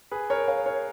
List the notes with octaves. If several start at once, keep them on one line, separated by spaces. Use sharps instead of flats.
G#4 B4
A#4 C#5
C#5 F5
A#4 C#5